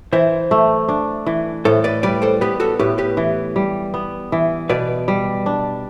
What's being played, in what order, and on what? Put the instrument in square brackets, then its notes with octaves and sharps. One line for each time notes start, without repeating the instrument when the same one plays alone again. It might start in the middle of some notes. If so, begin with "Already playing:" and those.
[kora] E3 [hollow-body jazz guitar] C5 E5
[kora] A3
D4
E3
[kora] A2 [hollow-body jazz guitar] A4 C5
[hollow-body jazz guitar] B4 D5
[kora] G3 [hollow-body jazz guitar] B4 D5
[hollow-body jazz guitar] A4 C5
[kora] B3 [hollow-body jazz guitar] G4 B4
[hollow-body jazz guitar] F#4 A4
[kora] A2 [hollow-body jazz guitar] G4 B4
[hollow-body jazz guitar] G4 B4
[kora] E3
G3
B3
E3
[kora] B2 [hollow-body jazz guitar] B4 D5
[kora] G3
D4